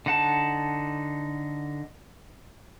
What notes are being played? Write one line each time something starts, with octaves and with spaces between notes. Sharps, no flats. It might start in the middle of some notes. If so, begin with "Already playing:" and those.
D3 D#4 F#5 A5